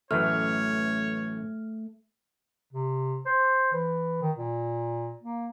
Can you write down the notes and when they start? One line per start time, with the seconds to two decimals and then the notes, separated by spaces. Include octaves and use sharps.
0.11 A1 F#2 E3 A3 C#5 F6
2.73 C3
3.26 C5
3.72 E3
4.22 D#3
4.36 A#2
5.22 A#3